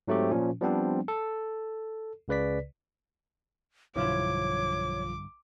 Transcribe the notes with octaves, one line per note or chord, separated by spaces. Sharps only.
G#2 F#3 A3 C4 G4
A#2 F3 C#4
F3 G3 B3 C4 D4
A4
C#2 C#3 B4 D5 B6
B1 G2 D3 F3 E4 F4 C#5 D6